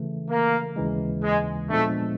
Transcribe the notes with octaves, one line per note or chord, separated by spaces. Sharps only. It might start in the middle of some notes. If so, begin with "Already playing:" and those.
Already playing: C#3 E3 A3
A#3
D#2 C#3 E3 G#3
G#3
A#2 F3 G#3 A3 B3 D4